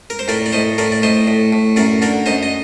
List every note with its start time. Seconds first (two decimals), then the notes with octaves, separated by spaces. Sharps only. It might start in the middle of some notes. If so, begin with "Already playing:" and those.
0.10 A#4
0.19 C5
0.28 A2 A#4 D5
0.46 D5
0.52 A2 C5 D#5
0.78 A2 A#4 D5
0.92 D5
1.02 A2 C5 D#5
1.27 A2
1.52 A2
1.76 F#2 A#4 D5
2.02 D3 A#4 D5
2.26 F#2 C5 D#5
2.43 D#5